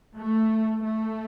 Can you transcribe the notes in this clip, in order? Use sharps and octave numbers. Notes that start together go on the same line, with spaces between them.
A3
A3